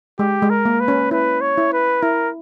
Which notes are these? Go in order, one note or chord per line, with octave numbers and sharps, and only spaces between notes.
G#3 G4
G#3
A#4
A#3
B4
C#4
E4 B4
C#5
E4
B4
E4 A#4